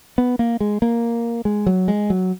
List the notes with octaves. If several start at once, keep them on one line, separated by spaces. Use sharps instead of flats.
B3
A#3
G#3
A#3
G#3
F#3
G#3
F#3